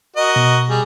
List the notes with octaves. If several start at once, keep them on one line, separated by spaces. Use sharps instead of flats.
F#4 A#4 D#5
B2
G3 G#4